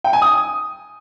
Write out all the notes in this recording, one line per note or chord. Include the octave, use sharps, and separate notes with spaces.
G5
G#5
D#6